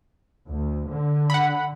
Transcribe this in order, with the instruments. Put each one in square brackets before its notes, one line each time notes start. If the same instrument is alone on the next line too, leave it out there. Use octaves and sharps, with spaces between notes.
[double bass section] D2
D3
[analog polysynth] F#5 B5